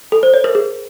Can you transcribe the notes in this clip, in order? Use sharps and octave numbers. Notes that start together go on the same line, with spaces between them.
A4
C5
C#5
A#4
G#4